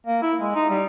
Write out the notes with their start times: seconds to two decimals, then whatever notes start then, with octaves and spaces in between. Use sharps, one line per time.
0.07 A#3
0.23 E4
0.41 G#3
0.55 D#4
0.70 G3